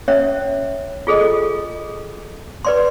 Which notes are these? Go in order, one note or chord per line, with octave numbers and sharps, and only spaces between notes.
C#4 C#5 E5
F4 G#4 A4 D#5
B4 D5 C6